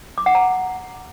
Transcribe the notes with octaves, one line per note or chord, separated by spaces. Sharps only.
D6
F#5
A#5